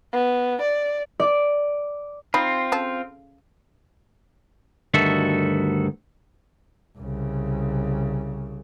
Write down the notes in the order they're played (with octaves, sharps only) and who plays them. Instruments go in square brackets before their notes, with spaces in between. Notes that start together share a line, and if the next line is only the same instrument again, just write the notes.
[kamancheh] B3
D5
[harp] D5
[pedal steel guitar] C4 F4 [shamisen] D#4 B5
[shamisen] C#3 A4
[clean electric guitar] D2 G2 D#3 F#4 A4 E5
[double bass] C2 C#3